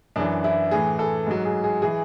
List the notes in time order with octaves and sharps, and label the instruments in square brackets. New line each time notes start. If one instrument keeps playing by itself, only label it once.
[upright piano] F#2 E3 D4
E4
A2 E3 G#4
A4
G#2 F#3
G#4
G#4
E3 G#4